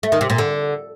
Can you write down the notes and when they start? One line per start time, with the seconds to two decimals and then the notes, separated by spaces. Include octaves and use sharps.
0.03 A3
0.12 D#3
0.21 C3
0.30 A#2
0.38 D3